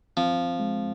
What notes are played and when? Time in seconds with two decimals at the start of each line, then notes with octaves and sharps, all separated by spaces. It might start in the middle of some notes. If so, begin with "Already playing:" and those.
0.17 F3 C4
0.60 G#3